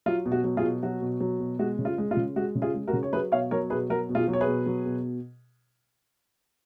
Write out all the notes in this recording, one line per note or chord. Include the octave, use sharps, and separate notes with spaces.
F#3 F4
B2
F#4
F#3
F4 G#4
B2
F#3 F#4
B2
F#3
B2
G#3 F#4
C#3
F4
G#3
F4
C#3
G#3 F#4
C#3
F4 G#4
G#3
F#4 A#4
C#3
C#5
F#3 G#4 B4
B2 C#5 F5
F#3 A#4 C#5
B2 G#4 B4
F#3 F#4 A#4
B2
F4 G#4
F#3
C#5
G#4 B4
B2
F#3
B2